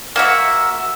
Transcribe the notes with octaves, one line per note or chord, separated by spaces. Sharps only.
A#3 F#4 E5